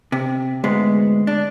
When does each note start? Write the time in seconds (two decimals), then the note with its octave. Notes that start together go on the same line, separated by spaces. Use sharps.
0.12 C3
0.64 D2 G#2 G#3 B3
1.27 D4